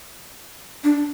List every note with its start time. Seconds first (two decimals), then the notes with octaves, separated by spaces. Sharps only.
0.84 D4